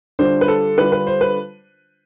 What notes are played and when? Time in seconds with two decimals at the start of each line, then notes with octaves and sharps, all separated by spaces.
0.19 D3 G3 D4 F4 C5
0.41 B4
0.48 A4
0.77 D3 G3 D4 F4 B4
0.92 B4
1.07 C5
1.21 B4